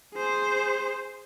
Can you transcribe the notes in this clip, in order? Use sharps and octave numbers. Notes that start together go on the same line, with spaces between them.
G#4 C5